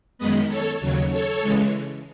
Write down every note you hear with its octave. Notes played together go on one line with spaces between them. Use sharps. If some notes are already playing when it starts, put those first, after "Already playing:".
F#2 D#3 G#3 B3 B4 D#5
A4 C#5
D#2 C#3 F#3 C#4
A4 C#5
C#3 E3 G#3